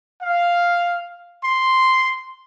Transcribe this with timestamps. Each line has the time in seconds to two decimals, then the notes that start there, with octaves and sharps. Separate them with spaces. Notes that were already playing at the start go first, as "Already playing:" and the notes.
0.23 F5
1.45 C6